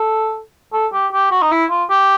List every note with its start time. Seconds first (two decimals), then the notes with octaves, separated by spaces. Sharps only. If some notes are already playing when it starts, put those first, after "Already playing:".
Already playing: A4
0.73 A4
0.93 G4
1.13 G4
1.31 F#4
1.42 D#4
1.51 E4
1.70 F4
1.90 G4